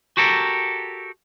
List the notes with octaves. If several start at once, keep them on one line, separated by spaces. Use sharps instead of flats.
F#4 G4 A4 A#4